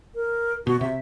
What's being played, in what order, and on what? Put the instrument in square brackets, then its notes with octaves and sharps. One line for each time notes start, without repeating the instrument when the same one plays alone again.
[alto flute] A#4
[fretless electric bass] B2 [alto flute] F#4
[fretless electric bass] C3 [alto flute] E5